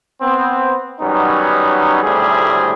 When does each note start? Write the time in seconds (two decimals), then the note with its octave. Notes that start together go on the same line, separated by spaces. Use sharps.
0.21 B3 C4
1.01 D#3 F#3 G3 B3 C#4 D#4
2.03 G#1 D2 A2 C3 G3 G#4